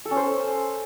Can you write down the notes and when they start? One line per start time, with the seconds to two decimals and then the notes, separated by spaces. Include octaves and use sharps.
0.05 A4
0.11 C#4
0.17 C5